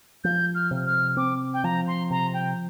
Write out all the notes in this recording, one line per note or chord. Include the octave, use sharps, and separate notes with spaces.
F3 G6
F6
C3
F6
C4 D6
G5
F3 A#5
C6
C3 A#5
G5